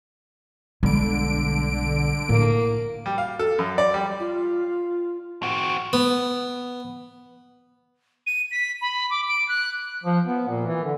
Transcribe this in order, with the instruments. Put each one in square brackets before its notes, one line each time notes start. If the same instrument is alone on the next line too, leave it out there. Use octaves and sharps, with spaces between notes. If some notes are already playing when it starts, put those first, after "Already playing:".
[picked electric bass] B1 G3 B3 [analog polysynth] D3 D7 [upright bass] G#3
[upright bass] A2 [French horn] A#3
[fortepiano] G3
F5
A4
F#2
D5
G3
[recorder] F4
[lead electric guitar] C4 F#4
[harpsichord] B3
[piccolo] D#7
B6
B5
D6
D7
F#6
[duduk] F3
B3
A#2
E3
D3